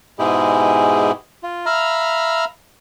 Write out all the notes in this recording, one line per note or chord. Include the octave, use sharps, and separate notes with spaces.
G#2 B2 G#3 E4 G4 G#4
F4
E5 F5 A#5 B5 F6